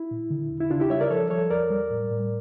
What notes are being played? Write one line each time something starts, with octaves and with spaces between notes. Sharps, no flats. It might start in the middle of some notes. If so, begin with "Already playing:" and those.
Already playing: E4
A#2
D3
E2
E4
C#3 D4 F4
E4 G4
G3 C#5 E5
A#4 D5
F3 A4 C#5
F3 A4 C#5
E2 A#4 D5
G3
A2
A2